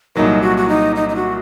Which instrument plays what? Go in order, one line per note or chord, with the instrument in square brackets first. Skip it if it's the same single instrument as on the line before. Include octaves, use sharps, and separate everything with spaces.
[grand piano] C2 A#2 F#3 A#3 [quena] D#4
[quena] F#4
F#4
D#4
D#4
D#4
F#4